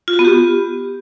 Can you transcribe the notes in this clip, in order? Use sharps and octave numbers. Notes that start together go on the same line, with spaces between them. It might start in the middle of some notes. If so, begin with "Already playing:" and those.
F4
F#4
B3
G4